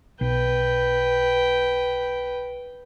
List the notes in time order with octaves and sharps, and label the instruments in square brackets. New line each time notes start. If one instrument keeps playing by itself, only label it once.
[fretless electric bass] B1 [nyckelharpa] B4 G5